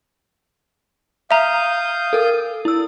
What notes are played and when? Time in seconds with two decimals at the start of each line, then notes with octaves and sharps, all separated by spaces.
1.31 E5 F5 A#5 D#6 G6
2.13 A4 A#4
2.65 E4 E6